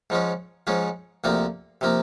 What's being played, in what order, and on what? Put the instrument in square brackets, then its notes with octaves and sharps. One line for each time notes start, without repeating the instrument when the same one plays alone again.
[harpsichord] G#2 F3 G#3 C#4
G#2 F3 G#3 C#4
D2 C3 F3 A#3
C3 F3 A#3